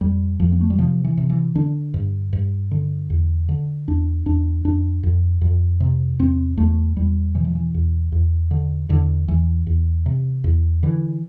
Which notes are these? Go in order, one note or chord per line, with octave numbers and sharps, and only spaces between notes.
F2 G3
F2 F3
B3
A3
G3
C3 F3
E3
C3
E3
D3 D4
G2
G2
D3
E2
D3
E2 D4
E2 D4
F2 D4
F2
F2
C3
E2 C4
E2 A3
E2 G3
B2 E3
F3
E3
E2
E2
D3
E2 D3
E2 E3
E2
C3
E2
D3 E3